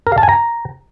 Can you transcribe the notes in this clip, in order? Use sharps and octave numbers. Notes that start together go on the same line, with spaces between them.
A#4
F5
A5
G#5
A#5